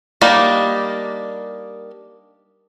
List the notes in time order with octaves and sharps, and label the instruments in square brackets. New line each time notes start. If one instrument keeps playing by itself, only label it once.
[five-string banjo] G3 A#3 D4 D#4